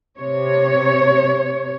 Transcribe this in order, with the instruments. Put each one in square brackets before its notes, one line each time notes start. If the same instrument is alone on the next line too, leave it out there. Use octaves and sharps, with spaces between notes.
[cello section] C3 C#5